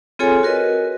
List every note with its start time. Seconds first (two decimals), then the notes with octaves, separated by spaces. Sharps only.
0.19 C4 F4 G#4 A4 C#5 G#5
0.43 F#4 A#4 B4 D#5